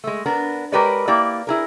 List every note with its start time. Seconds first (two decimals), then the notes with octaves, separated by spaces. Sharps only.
0.04 G#3 A3
0.26 B3 D4 A#4
0.72 G#3 G4 A#4 B4 C#5 D5
1.08 A#3 E4 G4 D5
1.47 E4 G#4 A#4